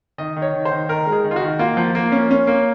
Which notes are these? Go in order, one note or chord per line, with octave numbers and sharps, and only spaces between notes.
D#3 D#5
D#3
C#5
D#3
C5
D#3
D#3 A#4
G#3
G#4
D#3
F4
F#4
D#3
A#3 F4
F3
A#3
C#4
C#4
A#3